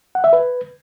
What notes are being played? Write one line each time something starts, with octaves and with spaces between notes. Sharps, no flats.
F#5
E5
B4